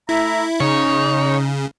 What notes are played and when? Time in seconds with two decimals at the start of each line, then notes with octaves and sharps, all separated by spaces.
0.09 A3 E4 E5 A#5
0.60 C#3 D#4 C#5